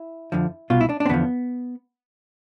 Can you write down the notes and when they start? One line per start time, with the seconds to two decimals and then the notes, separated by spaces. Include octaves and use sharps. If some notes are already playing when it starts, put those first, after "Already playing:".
Already playing: E4
0.32 F2 D3 F3
0.70 C2 B2 F4
0.81 E4
0.89 D4
1.00 D4
1.06 C4
1.09 E2 D3 F3 B3